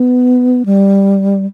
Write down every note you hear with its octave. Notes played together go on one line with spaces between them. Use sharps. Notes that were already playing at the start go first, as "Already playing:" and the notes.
Already playing: B3
G3